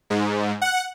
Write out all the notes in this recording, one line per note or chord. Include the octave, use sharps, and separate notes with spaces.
G#2
F#5